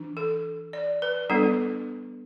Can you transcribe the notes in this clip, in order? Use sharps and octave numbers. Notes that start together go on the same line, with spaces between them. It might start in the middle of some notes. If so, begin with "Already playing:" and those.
Already playing: E3 D4
A4
D5
B4
G3 B3 D4 A4